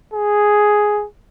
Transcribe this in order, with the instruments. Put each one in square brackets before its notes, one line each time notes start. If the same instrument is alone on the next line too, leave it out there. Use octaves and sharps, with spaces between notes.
[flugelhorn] G#4